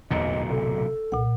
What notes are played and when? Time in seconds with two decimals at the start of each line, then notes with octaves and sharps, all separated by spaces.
0.11 D1 B1 E2 A#2 D#5
0.50 C3 A4
1.12 C2 A#2 F#5